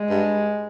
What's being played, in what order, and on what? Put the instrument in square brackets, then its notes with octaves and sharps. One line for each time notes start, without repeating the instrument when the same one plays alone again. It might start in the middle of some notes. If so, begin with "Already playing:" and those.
Already playing: [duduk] G#3
[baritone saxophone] G2